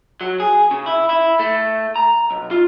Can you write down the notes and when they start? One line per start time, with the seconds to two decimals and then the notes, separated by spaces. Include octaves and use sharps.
0.21 F#3
0.40 G#4
0.71 C#3
0.86 E4
1.09 E4
1.39 A3
1.96 A#5
2.31 B1
2.51 F4